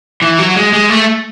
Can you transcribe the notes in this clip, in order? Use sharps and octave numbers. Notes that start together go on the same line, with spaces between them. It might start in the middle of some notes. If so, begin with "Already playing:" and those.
E3
F#3
G#3
G#3
A3